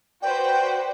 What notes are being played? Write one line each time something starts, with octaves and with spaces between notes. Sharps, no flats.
F#4 B4 C5 D5 G5